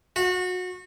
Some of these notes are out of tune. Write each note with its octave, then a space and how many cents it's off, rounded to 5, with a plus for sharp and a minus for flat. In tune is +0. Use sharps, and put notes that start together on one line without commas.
F#4 -25